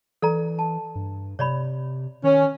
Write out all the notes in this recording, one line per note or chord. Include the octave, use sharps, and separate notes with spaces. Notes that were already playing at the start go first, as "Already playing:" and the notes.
E3 A4 D5 A#5
A5
G2
C3 C#5 D5 B5
D#3 C#4